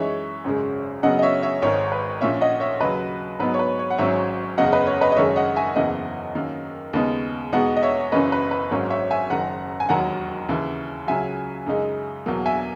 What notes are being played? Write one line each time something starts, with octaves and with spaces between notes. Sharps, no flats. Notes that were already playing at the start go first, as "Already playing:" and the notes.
Already playing: F#2 E3 G#3 D#4 C#5 E5
G#1 F#2 C#3 G#3
F#2 C#3 F#3 B3 D#5 F#5
D#5
C#5 E5
C#5 E5
G#1 G#2 D#3 C#5
B4
A#1 A#2 A#3 C#4 C#5 E5
D#5 F#5
C#5 E5
D#2 C#3 F#3 B4 D#5
G#2 F#3 B3 D#4 B4
C#5
B4
C#5
F#5
G#1 G#2 F#3 C#4 C#5 E5
F#1 E2 C#3 D#5 F#5
B4 D#5
C#5
B4 D#5
D#5
F#1 F#2 D#3 G#3 D#4 C#5 E5
D#5 F#5
E5 G#5
F#1 E2 C#3 E3 A#3 D#5 F#5
F#2 D#3 A#3
D#2 C#3 G#3 B3 D#4
E2 B2 G#3 B3 D#4 D#5 F#5
D#5
C#5 E5
F#1 F#2 E3 A#3 C#4 B4 D#5
B4
B4
G#1 G#2 F#3 A#3 C#4 C#5
C#5 E5
E5 G#5
F#1 F#2 D#3 F#5 A#5
G#5
E1 D#2 D#3 F#3 F#5 A#5
D#2 C#3 E3
C#2 C#3 F#3 E5 G#5
F#2 C#3 G#3 D#4
E2 B2 F#3 A#3
E5 G#5